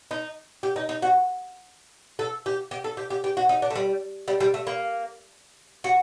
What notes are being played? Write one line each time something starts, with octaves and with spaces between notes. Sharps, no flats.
D#4
G4
D#4
D#4
F#4
A4
G4
G4
A4
G4
G4
G4
F#4
D#4
D4
A3
G3
G3
G3
A3
A#3
F#4